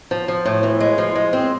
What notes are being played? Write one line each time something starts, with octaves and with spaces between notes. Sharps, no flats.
F3
F3
A2
E3
G#3
F3
G#3
C4